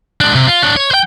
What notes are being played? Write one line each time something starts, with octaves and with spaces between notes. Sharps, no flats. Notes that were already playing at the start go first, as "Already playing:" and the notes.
G#3 D4
C3
F4
D4 C#5
C#5
C5 G5